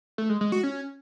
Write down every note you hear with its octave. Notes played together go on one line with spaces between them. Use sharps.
A3
G#3
G#3
F#4
C#4